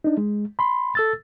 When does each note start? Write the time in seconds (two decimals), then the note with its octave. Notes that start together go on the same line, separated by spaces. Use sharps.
0.04 D4 D#4
0.17 G#3
0.59 B5 C6
0.95 A4 E6 A6